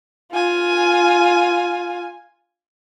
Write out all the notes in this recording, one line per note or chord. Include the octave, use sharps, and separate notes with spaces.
F4 G#5